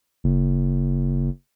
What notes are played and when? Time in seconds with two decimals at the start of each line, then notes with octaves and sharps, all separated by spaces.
0.24 F#1